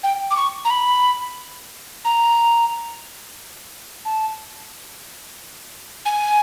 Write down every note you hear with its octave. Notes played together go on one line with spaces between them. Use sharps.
G5
D6
C#6
A#5
B5
A#5
A5
G#5